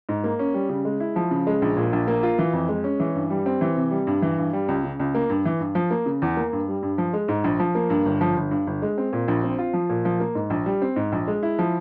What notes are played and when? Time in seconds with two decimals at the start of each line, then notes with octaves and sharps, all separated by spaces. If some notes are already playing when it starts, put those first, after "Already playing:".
0.09 G#2
0.24 A#3
0.39 C#4
0.54 G3
0.69 C#3
0.85 G#3
1.00 E4
1.16 F3
1.31 C#3
1.47 G#3
1.62 A#1
1.77 A#2
1.93 A#1
2.08 A#3
2.23 F4
2.39 E3
2.53 F2
2.69 G#3
2.84 C#4
3.00 E3
3.15 G2
3.30 G3
3.46 C4
3.61 E3
3.77 C3
3.91 G3
4.07 G2
4.22 E3
4.38 G2
4.53 G3
4.68 C#2
4.84 C#3
5.00 C#2
5.15 A#3
5.30 G2
5.45 E3
5.60 G2
5.75 F3
5.91 A#3
6.06 C#3
6.22 E2
6.37 A#3
6.53 G2
6.68 G3
6.83 G2
6.98 F3
7.13 G#3
7.28 G#2
7.44 A#1
7.60 F3
7.75 A#3
7.90 G2
8.05 G1
8.21 F3
8.37 G1
8.51 G2
8.67 G1
8.82 G#3
8.98 C4
9.13 A#2
9.28 A#1
9.43 C4
9.59 F4
9.74 F3
9.90 A#2
10.05 F3
10.20 A#3
10.35 G#2
10.50 A#1
10.66 G3
10.82 C4
10.96 G#2
11.12 A#1
11.28 G#3
11.43 E4
11.59 F3